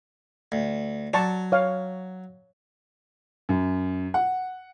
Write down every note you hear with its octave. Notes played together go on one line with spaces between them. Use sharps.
D2
F#3 D5 A5 C#6
C#5 F5
F#2
F#5